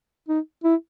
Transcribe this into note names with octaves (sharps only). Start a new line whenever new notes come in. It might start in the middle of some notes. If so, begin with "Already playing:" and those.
D#4
E4